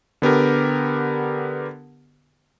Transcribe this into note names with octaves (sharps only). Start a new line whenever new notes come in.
D3 B3 G4 A#4